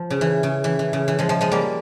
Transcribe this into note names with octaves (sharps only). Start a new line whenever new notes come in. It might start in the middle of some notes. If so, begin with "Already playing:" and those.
Already playing: F3
C#3
E3
C#3
E3
E3
C#3
E3
F3 G#3
F3 G#3
F3 G#3
G3 A#3